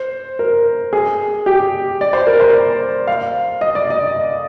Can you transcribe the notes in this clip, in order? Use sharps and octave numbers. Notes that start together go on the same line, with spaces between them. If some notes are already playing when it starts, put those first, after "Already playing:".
Already playing: C5
A#4
G#4
G4
D5
C5
A#4
C5
F5
D#5
D5
D#5